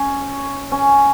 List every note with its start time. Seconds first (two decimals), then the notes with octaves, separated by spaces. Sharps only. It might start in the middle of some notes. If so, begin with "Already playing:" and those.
Already playing: C#4
0.72 C#4